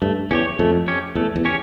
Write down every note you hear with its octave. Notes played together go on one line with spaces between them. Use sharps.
G2 A3
E2 C#4 G4 C#5
F2 A3
C#4 G4 C#5
E2 A3
E2
C#4 G4 C#5